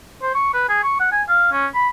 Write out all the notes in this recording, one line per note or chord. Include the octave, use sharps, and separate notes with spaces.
C5
C#6
B4
G#4
C#6
F#5
G#5
F5
C#4
B5